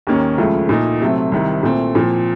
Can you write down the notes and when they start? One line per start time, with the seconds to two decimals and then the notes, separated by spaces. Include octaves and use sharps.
0.07 D#2 D#3 A#3 C#4
0.38 C#2 C#3 F3 A3
0.69 A#2 A3 D#4
1.01 C3 F#3 A3 C4
1.32 C2 C3 D#3
1.63 A#2 A3 C4
1.95 A#2 F3 C4